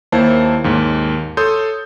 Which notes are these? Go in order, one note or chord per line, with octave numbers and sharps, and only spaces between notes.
D#2 A#3 E4 C5 C#5 A5
D#2 G#2 C#5
A4 C#5 C6 D#6 G6